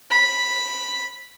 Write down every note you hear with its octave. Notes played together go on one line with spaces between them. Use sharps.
B5